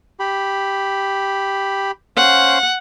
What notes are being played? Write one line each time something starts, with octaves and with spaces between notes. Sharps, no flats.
G4 B5
C#4 C5 F5 F#5